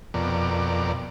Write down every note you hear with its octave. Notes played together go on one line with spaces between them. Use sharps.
F2 B2 A#4 D5